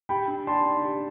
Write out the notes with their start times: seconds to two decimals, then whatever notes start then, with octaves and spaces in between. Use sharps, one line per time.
0.09 G4 G5 B5
0.28 D4
0.47 D5 A5 C6
0.66 D4
0.85 G4